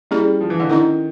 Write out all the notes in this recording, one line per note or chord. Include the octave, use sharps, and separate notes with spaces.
G3 C#4 E4 G#4
F3
E3
D3
D#3 C#4 E4 A4